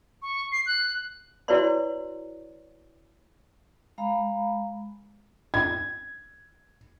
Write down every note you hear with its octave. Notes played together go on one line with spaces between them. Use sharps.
C#6
C7
F#6
E4 F#4 B4 C#5 D5 C6
G#3 F5 A#5 B5
G#6